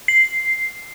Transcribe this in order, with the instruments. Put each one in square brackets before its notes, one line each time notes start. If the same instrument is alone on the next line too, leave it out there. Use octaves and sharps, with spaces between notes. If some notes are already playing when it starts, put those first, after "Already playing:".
[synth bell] C7